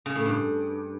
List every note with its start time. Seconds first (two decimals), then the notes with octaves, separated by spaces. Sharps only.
0.06 C#3
0.15 A2
0.25 G2